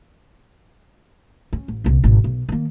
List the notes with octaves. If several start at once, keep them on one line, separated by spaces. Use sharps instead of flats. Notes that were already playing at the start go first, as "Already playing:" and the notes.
C#4
A1
C2 A#2
G#1 B2
B1
D#3 A#3